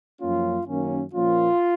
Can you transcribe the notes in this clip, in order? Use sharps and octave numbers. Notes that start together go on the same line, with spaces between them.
F#2 F3 A#3 C#4 F4
F#2 D#3 A#3 C#4
A#2 F3 A#3 C#4 F4